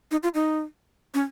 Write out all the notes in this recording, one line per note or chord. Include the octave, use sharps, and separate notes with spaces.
D#4
F4
D#4
C#4